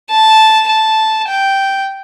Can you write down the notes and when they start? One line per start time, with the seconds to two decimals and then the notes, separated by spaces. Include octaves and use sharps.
0.10 A5
0.69 A5
1.28 G5